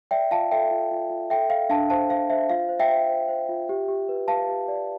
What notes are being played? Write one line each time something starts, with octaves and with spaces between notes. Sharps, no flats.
D5 E5 G5
F4 F5 A5
A4 E5 G5
F4
F4
F4
A4 E5 G5
A4 F5
D4 F5 A5
C5 F5 A5
C5 F5
C5 E5
F4 F5
C5
E5 G5
C5
C5
C5
F4
G4
G4
B4
B4 F5 A5
G4
D5